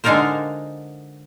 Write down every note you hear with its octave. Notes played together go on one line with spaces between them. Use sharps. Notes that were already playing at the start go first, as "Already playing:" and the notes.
D3 G#3 D#4 F4 A#4 C5